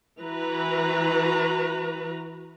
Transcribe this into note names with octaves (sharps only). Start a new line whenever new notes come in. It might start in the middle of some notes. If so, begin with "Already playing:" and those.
E3 F#4 B4 A#5